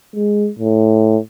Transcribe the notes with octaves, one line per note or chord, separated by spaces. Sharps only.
G#3
A2